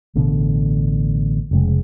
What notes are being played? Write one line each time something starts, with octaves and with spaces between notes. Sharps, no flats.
A1 B2 D3
F1 C#3 G#3